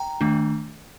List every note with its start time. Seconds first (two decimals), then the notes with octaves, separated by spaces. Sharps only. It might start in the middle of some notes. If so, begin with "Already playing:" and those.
Already playing: G5 A#5
0.21 D#3 A3 D4